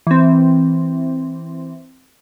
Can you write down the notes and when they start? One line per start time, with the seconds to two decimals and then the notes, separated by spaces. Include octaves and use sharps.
0.07 E3 C4